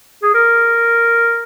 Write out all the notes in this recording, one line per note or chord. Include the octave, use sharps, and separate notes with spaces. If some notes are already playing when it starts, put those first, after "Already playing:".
G#4
A#4